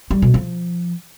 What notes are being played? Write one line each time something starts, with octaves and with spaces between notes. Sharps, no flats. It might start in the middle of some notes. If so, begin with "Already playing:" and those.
G3
B2
F3